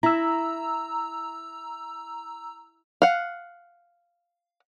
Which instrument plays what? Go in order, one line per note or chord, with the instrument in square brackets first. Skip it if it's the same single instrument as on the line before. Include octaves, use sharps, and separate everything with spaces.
[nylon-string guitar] E4 [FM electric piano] A#5 E6
[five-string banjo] F5 F#5